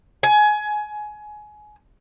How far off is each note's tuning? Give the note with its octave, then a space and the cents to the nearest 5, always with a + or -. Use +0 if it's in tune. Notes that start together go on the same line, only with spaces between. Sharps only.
G#5 +20